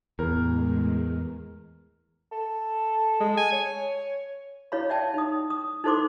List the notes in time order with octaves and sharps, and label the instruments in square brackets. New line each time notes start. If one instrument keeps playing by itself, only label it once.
[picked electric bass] E2 [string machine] A2 G#3 [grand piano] A#4
[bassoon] A4
[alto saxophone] G#3
G#5
C#5
[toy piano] E4 C#5 F5 B5
D5 E5 G5 A5
D#4 D#6
D#6
D#4 E4 A4 C5 C6 D6